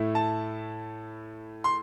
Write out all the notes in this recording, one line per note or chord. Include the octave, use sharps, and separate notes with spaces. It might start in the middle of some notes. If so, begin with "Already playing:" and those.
Already playing: A2 A3 E4
A5
C6